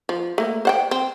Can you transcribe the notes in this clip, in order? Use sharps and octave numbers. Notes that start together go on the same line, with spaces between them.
F3
A3 A#3
C5 F#5 G5
C4